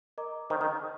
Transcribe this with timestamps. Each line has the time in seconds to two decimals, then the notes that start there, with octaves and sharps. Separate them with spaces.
0.18 A#4 D#5 A#5 D6
0.50 D#3 C5 D#5 A#5
0.61 D#3